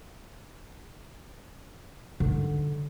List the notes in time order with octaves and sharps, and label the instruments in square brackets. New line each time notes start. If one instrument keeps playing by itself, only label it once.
[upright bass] D3 D#3